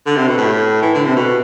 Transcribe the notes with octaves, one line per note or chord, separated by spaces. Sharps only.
D3
C3
B2
A2
E3
D3
C3
B2